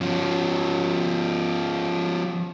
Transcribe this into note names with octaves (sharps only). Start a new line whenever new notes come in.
F3 C#4